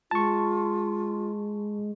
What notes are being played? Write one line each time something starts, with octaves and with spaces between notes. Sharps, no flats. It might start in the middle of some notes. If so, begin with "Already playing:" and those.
G#3 F4 A5 C#6